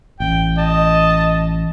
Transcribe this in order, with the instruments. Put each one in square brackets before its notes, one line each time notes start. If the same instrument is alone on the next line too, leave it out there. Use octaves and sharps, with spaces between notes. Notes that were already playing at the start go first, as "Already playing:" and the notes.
[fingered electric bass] A1 [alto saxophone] G5
[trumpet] D#5 [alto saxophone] A5